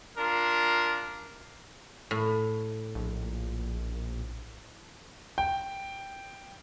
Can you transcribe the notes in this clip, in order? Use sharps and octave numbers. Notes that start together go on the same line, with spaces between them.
D4 F4 A#4
A2
A#1
G5